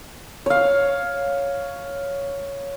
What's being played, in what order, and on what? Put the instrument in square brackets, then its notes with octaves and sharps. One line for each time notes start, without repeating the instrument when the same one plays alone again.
[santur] C#5 F5